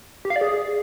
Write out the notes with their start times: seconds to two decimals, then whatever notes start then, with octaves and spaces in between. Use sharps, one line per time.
0.25 G4
0.30 F5
0.36 D5
0.41 G#4